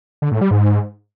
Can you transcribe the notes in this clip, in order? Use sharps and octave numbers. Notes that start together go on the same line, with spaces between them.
D3
A2
G3
G#2